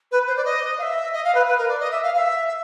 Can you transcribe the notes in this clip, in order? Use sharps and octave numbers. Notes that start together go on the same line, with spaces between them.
B4
C5
D5
D#5
F5
E5
D#5
F5
B4
B4
A#4
D5
D#5
E5
F5
F5
E5
E5